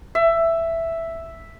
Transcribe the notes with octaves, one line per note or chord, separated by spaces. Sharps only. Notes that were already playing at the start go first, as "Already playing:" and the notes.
E5